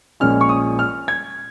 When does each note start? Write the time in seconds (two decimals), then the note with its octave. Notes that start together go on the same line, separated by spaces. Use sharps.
0.20 A#1 A#2 G#3 C#4 F6
0.41 C#6
0.49 D#6
0.79 F6
1.08 G#6